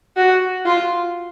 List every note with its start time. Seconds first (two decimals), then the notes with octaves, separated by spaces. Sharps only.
0.16 F#4
0.65 F4